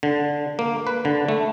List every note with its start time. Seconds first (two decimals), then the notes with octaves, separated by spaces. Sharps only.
0.03 D3
0.59 A#3
0.87 B4
1.05 D3
1.29 A3